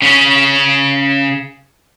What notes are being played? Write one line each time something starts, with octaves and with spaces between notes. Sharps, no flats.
C#3 C#4